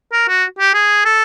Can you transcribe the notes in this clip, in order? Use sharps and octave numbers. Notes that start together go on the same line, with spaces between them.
A#4
F#4
G4
G#4
A4